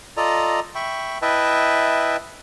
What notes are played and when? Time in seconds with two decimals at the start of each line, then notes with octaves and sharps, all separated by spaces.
0.17 F4 A4 D5 D#5 A#5
0.75 E5 G5 B5 C#6
1.22 E4 B4 D#5 E5 G5 A5